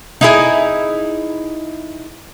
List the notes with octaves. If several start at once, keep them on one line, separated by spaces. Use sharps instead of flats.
D#4 E4 G#4